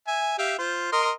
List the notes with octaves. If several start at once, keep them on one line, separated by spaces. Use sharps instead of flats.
E5 G#5
G4 E5 F5
F4 C5
A#4 D#5 C6